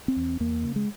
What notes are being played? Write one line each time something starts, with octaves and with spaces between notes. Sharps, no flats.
C4
E2
E2 A#3
C#3
G#3